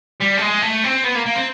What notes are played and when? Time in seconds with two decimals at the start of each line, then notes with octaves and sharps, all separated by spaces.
0.21 G3
0.38 A3
0.42 G#3
0.62 A3
0.84 C4
1.04 B3
1.15 A#3
1.26 A#3
1.36 C4